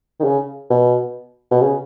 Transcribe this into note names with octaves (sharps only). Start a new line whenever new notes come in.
D#3
C#3
B2
B2
C#3